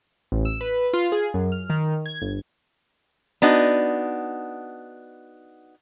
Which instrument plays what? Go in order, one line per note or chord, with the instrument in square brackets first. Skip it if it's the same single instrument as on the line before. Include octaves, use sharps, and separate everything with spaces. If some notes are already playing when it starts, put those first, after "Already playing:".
[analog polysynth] A1
E6
B4
F4
G#4
F#2
F6
D#3
G#6
G1
[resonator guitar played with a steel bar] B3 D4 D#4 F#4